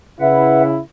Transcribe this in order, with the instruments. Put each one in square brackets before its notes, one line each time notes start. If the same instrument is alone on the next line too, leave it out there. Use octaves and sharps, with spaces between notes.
[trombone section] C#3 E4 [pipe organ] B4 E5 F#5